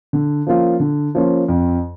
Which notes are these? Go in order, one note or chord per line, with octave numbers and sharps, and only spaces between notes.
D3
F3 A#3 C#4 F4
D3
F3 A#3 C#4 F4
F2